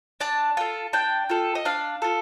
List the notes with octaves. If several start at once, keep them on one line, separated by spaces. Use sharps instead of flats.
D4 A5
F4 A4
D4 G5
F4 A4
D#5
D4 F5
F4 A4